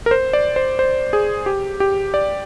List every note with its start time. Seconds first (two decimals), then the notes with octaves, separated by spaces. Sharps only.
0.06 A#4
0.11 C5
0.33 D5
0.56 C5
0.79 C5
1.13 G#4
1.46 G4
1.80 G4
2.14 D5